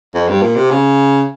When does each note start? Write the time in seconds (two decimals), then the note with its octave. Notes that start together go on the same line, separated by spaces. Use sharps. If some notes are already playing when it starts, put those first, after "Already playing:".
0.14 F2
0.28 G2
0.42 A#2
0.56 C3
0.71 C#3